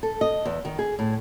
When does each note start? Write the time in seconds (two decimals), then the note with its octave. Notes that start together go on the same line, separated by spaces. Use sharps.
0.03 A4
0.21 D#5
0.45 E2
0.65 D#3
0.79 G#4
0.99 A2